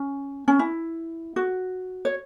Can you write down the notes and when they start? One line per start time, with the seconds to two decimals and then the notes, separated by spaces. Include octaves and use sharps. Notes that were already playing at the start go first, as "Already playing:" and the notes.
Already playing: C#4
0.48 C#4
0.59 E4
1.36 F#4
2.05 C#5